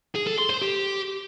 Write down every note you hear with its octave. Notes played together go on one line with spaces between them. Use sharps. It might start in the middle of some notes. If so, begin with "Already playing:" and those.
G#4
A4
C6
C5
G4